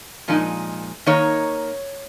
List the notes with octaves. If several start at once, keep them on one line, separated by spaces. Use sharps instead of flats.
A#2 F3 G#3 D#4
D#3 A#3 D#4 C#5